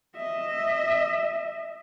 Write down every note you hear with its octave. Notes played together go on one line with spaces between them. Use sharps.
D#5 E5